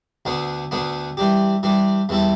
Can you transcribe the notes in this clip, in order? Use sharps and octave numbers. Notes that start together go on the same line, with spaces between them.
D2 D3 B3 D4
D2 D3 B3 D4
E3 G3 D4 G4
E3 G3 D4 G4
E2 E3 G3 E4 A4